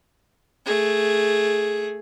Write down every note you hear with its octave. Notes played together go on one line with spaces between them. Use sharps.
A3 G#4